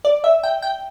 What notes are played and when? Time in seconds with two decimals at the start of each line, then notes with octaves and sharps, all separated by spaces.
0.05 D5
0.24 E5
0.43 G5
0.62 G5